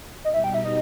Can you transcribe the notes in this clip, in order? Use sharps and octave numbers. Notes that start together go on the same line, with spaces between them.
B2 G3 D#4 D#5
E5
G5
E5
D#5